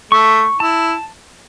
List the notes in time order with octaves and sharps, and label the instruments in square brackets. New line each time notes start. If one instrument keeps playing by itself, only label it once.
[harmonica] A3 [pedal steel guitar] C#6
[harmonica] E4 [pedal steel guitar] A5